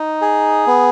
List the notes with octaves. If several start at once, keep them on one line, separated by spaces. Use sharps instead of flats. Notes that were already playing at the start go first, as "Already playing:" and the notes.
Already playing: D#4
G#4
B3